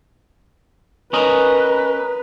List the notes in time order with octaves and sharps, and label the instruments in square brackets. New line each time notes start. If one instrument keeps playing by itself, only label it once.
[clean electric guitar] C#4 A#4 D#5 [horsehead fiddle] B4